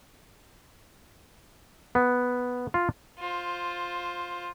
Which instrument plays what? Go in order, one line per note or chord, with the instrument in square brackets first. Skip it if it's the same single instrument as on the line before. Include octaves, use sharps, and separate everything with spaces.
[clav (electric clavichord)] B3
F4
[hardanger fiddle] F4 C5